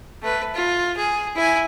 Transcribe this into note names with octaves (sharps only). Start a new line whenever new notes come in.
A3 B4
F4
G#4
E4 G#5